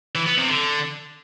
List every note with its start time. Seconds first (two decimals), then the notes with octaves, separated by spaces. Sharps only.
0.15 E3
0.27 B3
0.38 C3
0.50 D3